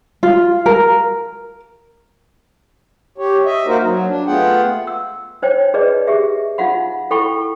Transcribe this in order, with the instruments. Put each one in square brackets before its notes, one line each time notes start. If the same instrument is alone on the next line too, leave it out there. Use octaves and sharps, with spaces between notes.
[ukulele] F4
A#4
[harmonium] G4 C#5
D#5 E5
A#3 D#4 F#4 A#4 C5
F#3
D4
A3 B3 F4 G#4 F#5 G5
[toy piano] E6
D#4 C5 C#5 G5
D#4 G#4 B4 D5 D#5
G4 G#4 E5
D#4 F4 F5 F#5 B5
E4 A4 G5 B5 C#6